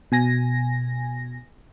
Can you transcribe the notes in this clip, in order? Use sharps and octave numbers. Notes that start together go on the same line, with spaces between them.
B2 G#5 A#6